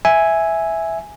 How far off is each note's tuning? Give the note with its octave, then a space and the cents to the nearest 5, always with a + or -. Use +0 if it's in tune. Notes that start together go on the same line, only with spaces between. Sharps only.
E5 -5 G#5 +0